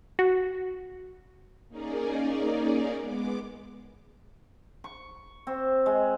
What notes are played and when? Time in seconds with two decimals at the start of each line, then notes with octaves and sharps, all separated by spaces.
0.19 F#4
1.68 A#3 C#4 D#4 G#4 A#4 D5
2.95 G#3 B3 D6
4.84 C#6
5.47 C4
5.86 G#3